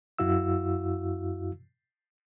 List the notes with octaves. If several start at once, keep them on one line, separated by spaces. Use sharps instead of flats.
F#2 E4 F#4 F5 E6